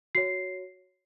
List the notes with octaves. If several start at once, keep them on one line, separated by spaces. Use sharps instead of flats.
F#4 C#5 C7